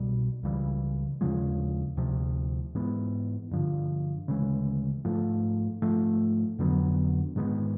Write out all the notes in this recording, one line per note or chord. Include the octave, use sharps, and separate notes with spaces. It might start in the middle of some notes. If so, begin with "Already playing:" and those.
Already playing: C2 B2 G3
C#2 C#3 E3 G3
D#2 C#3 F3 G#3
D2 C3 F3
G#2 E3 G#3 B3
G2 D3 F3
D2 C#3 E3 G#3
G#2 F3 A3
G#2 F3 A3
F2 D3 F#3 B3
G#2 D#3 G#3 B3